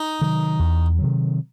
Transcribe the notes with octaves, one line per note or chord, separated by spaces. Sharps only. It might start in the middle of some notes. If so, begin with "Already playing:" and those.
Already playing: D#4
C3 D#3 F#3
E2
C3 D#3 F#3